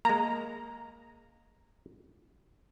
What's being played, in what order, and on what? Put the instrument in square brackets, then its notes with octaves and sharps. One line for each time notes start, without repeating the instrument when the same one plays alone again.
[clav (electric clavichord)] G#3 A#3 [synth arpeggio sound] A#5